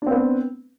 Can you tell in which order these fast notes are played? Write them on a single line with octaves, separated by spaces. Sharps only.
D4 C4 B3